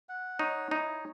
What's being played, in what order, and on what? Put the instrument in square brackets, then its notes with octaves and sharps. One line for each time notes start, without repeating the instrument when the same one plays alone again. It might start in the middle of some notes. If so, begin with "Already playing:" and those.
[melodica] F#5
[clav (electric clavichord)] D#4 [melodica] C#5
[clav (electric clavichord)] D#4 [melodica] E4